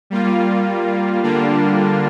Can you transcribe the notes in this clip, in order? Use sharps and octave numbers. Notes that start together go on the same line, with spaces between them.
G3 A#3 F4
D3 G3 A#3 D4 F4